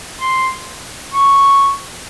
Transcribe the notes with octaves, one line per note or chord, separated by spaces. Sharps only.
C6
C#6